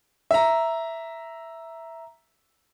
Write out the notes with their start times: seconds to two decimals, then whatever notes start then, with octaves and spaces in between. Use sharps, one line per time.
0.31 E5 A#5